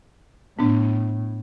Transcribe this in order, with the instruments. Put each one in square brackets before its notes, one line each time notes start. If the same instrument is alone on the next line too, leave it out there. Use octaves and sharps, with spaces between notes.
[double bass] A2 [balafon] B3 D4